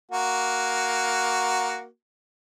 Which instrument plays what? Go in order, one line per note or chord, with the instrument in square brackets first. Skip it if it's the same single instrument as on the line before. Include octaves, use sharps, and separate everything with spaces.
[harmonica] A#3 F#4